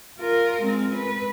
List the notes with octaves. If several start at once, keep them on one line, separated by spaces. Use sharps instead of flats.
F4 A#4
G#3 C4
B4